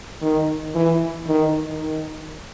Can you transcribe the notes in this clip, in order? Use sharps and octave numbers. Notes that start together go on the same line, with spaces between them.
D#3
E3
D#3
D#3